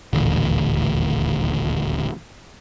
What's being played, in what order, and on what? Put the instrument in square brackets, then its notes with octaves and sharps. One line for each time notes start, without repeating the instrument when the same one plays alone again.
[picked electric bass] D#1 A1 D2